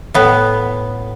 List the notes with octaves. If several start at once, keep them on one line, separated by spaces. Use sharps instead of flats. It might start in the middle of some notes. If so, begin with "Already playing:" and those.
A2 B3